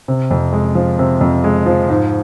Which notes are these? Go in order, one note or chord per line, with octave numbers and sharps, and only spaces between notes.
C3
F2
G#3
F3
C3
F2
G#3
F3
G#2